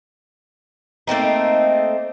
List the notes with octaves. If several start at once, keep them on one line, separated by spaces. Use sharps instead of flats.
A3 A#3 C4 D#4